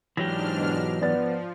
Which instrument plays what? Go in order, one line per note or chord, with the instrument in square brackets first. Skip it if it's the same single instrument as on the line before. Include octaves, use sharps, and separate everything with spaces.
[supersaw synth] G#2 D4 F6 [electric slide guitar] E3 F#3 G4 [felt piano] A#6
[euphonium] B2
[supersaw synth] F3 [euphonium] B3 [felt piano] D5 A6